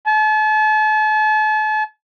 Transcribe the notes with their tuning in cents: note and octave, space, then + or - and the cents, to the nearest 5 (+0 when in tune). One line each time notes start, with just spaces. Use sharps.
A5 -40